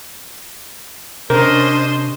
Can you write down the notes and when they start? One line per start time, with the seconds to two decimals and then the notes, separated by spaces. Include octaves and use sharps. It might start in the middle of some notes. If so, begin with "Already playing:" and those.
1.30 C3 C#4 D4 A#4 C5 D#5